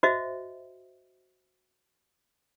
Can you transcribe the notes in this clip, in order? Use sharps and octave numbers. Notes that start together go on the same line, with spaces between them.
F#4 C5 D#5 E5